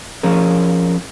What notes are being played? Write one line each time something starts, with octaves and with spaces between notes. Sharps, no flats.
F3 C#4 G#4 A#4